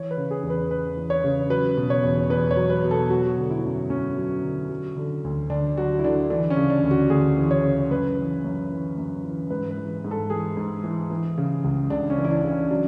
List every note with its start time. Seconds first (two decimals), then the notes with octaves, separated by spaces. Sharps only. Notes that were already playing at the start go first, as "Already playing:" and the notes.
Already playing: E3 C#5
0.11 B4
0.17 C#3
0.31 G#4
0.43 E2
0.50 B4
0.70 E2 B4
0.97 E3
1.10 C#5
1.24 C#3
1.50 F#3 B4
1.77 B2
1.90 C#5
2.03 E2
2.30 E2 B4
2.51 C#5
2.57 F#3
2.70 B4
2.84 B2
2.91 A4
3.10 F#3 F#4
3.37 D3
3.50 E4
3.64 F#2
3.90 F#2 C#4
4.18 F#3
4.43 D3
4.70 F#3
4.96 D3
5.24 D2
5.50 D2 D4
5.77 F#3 F#4
5.99 E4
6.04 D3 D4
6.30 E3 D4
6.50 C#4
6.57 C#3
6.70 D4
6.83 D2
6.91 F#4
7.10 D2 G#4
7.37 E3
7.51 C#5
7.64 C#3
7.91 F#2 B4
8.17 E3
8.44 F#2
8.70 E3
8.98 F#2
9.24 E3
9.50 G#2 B4
9.71 B4
9.77 E3
10.04 G#2
10.11 A4
10.30 E3 G#4
10.57 G#2
10.84 E3
11.10 E3
11.38 C#3
11.64 C#2
11.90 C#2 D4
12.10 C#4
12.18 E3
12.25 E4
12.31 D4
12.44 C#3
12.51 C#4
12.71 F#3 D4